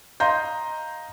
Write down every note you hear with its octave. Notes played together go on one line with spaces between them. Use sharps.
D#5 F5 A#5 C6 G6